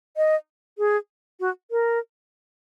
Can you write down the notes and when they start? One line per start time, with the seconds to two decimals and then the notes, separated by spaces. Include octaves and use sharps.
0.17 D#5
0.78 G#4
1.40 F#4
1.71 A#4